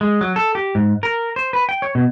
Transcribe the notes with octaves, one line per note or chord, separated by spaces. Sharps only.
G#3
F#3
A4
G4
G#2
A#4
C5
B4
G5
C#5
B2